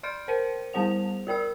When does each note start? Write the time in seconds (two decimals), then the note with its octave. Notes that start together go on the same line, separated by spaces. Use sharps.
0.03 D5 C6 F6 G6 D7
0.28 A#4 C5 C#7 D#7
0.73 G3 B3 C5 F#5 F7
1.27 F4 A#4 D5 E6